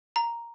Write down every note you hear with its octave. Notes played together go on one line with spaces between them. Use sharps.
A#5